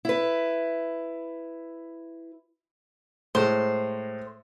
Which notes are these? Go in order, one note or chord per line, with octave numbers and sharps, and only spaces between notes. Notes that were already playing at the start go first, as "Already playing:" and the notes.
E4 B4
A2 G#3 C5